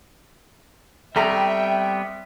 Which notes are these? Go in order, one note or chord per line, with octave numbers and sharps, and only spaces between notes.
G3 A3 B3 C4 E5 G5 A#5